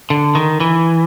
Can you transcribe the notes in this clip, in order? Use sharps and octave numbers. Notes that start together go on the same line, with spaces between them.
D3
D#3
E3